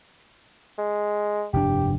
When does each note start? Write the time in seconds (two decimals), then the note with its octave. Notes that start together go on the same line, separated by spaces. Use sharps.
0.78 G#3
1.53 F1 G2 D4 G4